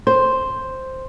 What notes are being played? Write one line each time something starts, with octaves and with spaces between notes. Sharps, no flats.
C5